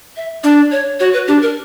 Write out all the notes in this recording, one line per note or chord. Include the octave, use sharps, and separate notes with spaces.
E5
D4 D5
C#5
F#4 C#5
B4
D4 G4
A#4